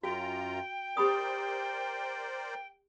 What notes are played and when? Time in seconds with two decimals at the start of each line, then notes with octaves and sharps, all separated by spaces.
0.03 F#2 F4 F#4 G5 A#5
0.97 G4 A#4 C5 D5 B5 D#6